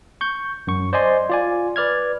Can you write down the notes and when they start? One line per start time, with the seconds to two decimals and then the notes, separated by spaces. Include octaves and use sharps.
0.21 C#6 G6
0.67 F#2 C#6
0.93 C5 D5 D#5 G#5 C6
1.30 F4 D5 G#5
1.76 B4 D5 F6 G#6